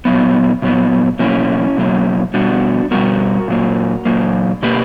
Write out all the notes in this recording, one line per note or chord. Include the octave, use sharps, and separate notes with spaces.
A#2 F#3 B3
A#2 F#3 B3
B2 F#3 A#3 C#4 E4
B2 F#3 A#3
B2 G3 B3 D4 F#4
B2 G3 B3 F#4 A#4
A#2 F#3 A#3
A#2 F#3 A#3
B2 A#3 G4 B4